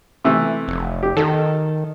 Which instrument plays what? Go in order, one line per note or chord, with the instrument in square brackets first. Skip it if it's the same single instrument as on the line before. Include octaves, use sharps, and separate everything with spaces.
[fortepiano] C3 E3 A3
[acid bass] F1
[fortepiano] G4
[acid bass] D#3 [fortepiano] A4